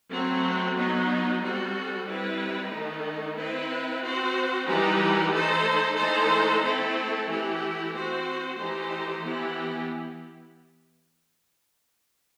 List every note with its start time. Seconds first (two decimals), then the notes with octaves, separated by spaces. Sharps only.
0.11 F#3 A3 C4
0.76 F#3 B3 D#4
1.42 G3 C4 F#4 A4
2.06 G3 C4 E4 B4
2.72 D#3 A3 D#4
3.37 C4 E4 B4
4.02 C4 F#4 C5
4.67 E3 G3 D#4 G4 B4
5.32 A3 D#4 A4 C5
5.97 E3 A3 D#4 A4 C5
6.63 A3 C4 E4 A4
7.28 E3 A3 E4 G4
7.93 C4 F#4 C5
8.58 E3 A3 D#4 G4 C5
9.23 E3 B3 E4 G4